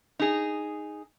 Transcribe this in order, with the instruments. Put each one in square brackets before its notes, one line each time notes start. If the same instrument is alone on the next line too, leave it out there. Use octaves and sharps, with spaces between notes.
[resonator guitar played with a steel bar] D#4 G#4